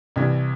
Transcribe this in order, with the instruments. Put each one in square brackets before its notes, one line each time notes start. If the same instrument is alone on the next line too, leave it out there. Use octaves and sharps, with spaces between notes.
[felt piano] C2 C3 E3